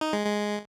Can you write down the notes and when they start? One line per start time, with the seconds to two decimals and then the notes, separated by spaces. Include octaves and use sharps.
0.01 D#4
0.13 G#3
0.25 G#3